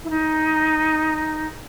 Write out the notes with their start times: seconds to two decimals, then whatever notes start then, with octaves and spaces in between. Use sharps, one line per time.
0.04 E4
0.10 D#4